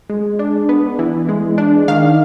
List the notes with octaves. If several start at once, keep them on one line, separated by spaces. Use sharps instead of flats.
G#3
D4
B3
E3
G#3
D4
D#3 F5